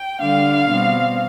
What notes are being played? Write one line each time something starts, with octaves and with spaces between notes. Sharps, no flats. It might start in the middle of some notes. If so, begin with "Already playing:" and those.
Already playing: G5
D3 G3 D4 F5
B2 G3 C4